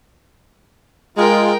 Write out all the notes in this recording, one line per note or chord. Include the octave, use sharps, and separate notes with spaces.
G#3 F4 A#4 G5